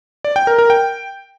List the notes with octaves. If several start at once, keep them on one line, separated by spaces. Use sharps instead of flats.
D5
G5
A#4
A#4
G5